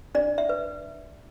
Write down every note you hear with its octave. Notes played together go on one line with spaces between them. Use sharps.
D4 D5
E5
B4